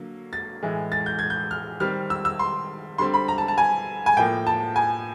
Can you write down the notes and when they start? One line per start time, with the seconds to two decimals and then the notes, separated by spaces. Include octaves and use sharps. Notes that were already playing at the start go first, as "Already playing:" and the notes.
Already playing: D3 F#3 A#3
0.33 A6
0.63 A2 E3 G#3
0.92 A6
1.06 G6
1.19 G#6
1.30 G6
1.51 F6
1.80 D#3 G3 C4 F6
2.10 E6
2.25 E6
2.39 C6
2.98 D3 G3 C4 C6
3.14 B5
3.28 A#5
3.38 A5
3.48 A5
3.58 G#5
4.06 G#5
4.17 A2 F3 A#3 G5
4.47 A5
4.76 G#5